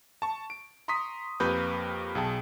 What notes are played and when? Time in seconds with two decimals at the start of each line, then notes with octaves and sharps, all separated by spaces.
0.22 A5 C#6
0.50 D7
0.88 A#5 C6 C#6 D#6 B6
1.40 F2 A#3 G4 A#4 B4 G6
2.15 B1 G#4 G5 A5